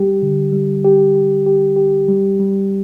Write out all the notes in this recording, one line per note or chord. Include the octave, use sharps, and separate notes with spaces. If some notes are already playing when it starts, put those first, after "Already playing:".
Already playing: G3 G4
D3
G3
G4
G4
G4
G4
G3
G3